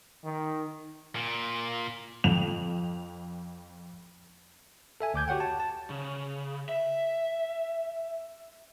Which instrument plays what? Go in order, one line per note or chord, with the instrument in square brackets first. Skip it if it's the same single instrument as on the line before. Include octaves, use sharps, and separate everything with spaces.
[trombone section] D#3
[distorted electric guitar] A#2
[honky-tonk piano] F2 F7
[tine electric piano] A4 E5 G#5
D2 D6 G6 G#6
F#4 G4 C#5 F#5 G5
A5
A5
[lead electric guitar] C#3
E5